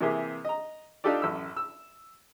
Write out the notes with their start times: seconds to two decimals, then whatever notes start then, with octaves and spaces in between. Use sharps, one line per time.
0.01 C3 E3 A#3 G4 G#4
0.45 D#5 A#5
1.04 D4 D#4 F4 G4 A4 D5
1.22 A1 F#2 E6
1.57 E6